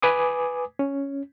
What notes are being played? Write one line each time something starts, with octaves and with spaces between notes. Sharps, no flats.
B4 G#5 D6 D#6
C#4